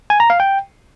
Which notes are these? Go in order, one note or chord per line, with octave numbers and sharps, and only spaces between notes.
G#5
A#5
F5
G5